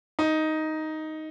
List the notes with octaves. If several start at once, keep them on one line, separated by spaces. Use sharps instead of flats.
D#4